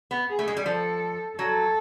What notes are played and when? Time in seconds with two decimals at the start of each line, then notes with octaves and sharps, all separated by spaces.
0.11 B3
0.29 G#4
0.39 A3
0.48 G#3
0.57 G3
0.66 F3 A4
1.38 F#3 A4